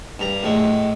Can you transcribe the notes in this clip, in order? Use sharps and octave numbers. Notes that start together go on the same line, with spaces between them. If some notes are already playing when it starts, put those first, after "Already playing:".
G2 A#5
A2 G#3